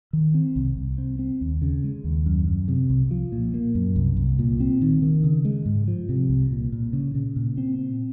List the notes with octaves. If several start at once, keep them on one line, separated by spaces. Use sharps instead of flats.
D#3
C4
C2
C2
C4
C4
D#2
C#3
G#3
D#2
F#2
F#2
C3
C2
F3
A#2
A#3
F#2
C2
C2
A#2
C4
D#3
D#3
C#3
G#3
G#2
F3
C3
C2
A#2
A#2
C#3
C#3
A#2
C4
C4